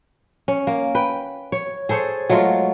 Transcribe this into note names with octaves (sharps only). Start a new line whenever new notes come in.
C#4
A#3
B4 G5
C#5
G#4 A4 C5 C#5
F#3 G#3 A3 F4